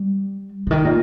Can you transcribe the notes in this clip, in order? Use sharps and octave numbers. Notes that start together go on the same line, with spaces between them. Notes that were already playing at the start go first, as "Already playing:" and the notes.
Already playing: G3
C#3
D#3
A#2